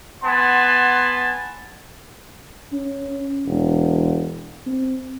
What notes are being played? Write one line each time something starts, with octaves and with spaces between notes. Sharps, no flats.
B3 F#5 G#5 A5 C6
C#4
E1
C4